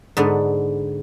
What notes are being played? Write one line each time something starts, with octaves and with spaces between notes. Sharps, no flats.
G#2 D3 B3